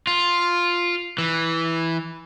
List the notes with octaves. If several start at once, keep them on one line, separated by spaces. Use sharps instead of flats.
F4
E3